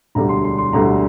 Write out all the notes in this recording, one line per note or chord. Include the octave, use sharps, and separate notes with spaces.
E1 D2 D3 G3 A#5
C6
C6
C6
E1 D2 D3 G3 A#5